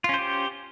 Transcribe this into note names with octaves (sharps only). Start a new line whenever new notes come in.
C#4 F4 G4 C5